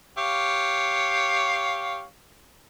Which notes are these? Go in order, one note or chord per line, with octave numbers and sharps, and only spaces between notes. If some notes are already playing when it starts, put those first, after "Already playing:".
G4 C#5 F5